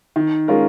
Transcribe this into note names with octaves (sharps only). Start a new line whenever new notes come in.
D#3
G#3 C#4 F4 A#4